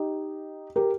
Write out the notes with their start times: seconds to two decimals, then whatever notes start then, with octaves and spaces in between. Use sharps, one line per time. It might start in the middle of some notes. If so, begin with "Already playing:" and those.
Already playing: D#4 G4
0.76 G4 A#4